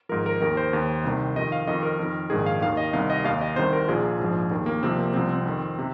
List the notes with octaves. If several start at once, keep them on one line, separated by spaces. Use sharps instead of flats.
G#1 G#2 F3 A#4
A#4
D#2 D#3 A#4
C5
D#2 D#3
C2 C3 D#3
F2 D#3 D#5
F5
F2 D#3 D#5
A#4
F2 D#3
A#1 G#2 D#3 G#4
F5
D#2 D#3 F5
D#5
C2 C3 D#3 F5
D#5
D#2 D#3 F5
D#5
C2 C3 D#3 C5
A#4
A#1 A#2 F3 G#4
A#1 G#2 F3
D#2 D#3
A#3
C2 C3 F3 C4
A#3
C2 C3 F3 C4
C4
F2 D#3
C3